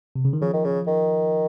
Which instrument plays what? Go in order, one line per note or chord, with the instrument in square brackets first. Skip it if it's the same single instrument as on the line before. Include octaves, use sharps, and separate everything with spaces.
[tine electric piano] C3
C#3
D#3
[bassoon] C#3 [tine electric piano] F3
[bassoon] D#3
C#3
D#3